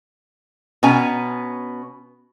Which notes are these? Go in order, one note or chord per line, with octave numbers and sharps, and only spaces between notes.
B2 B3 C#4 G#5 A#5